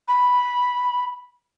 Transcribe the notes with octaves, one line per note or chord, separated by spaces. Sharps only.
B5